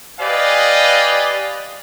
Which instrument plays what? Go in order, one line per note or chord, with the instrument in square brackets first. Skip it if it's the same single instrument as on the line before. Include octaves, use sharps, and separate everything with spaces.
[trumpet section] G4 B4 D5 D#5 F5 G#5